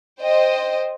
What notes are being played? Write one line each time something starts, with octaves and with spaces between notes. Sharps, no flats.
C5 D#5 G5